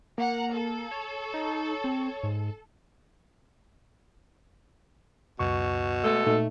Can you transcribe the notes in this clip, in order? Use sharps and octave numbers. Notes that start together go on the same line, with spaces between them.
A#3 F#5 A#5
A4
C#5
D#4
C4
G#2
C#2 F#2 B2 C#6
G#3 A3 A4
A#2 A3 D#4